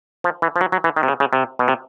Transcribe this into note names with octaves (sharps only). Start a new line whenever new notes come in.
F3
E3
F3
F#3
F#3
E3
D#3
C3
C#3
C#3
C3
B2
C3